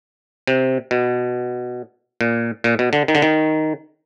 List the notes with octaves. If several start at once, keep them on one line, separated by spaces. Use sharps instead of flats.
C3
B2
A#2
A#2
B2
D3
D#3
D3
D#3